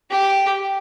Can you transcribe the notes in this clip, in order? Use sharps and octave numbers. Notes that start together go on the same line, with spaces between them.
G4